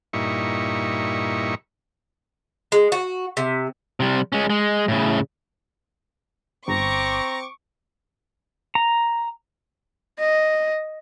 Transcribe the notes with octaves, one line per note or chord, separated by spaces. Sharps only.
G2 A#2 D#4 E4 C#6
G#3
F#4
C3
C3 G3
G#3 C#4
G#3
A2 C#3
G1 C4 A#5 C#6 D6
A#5
D#5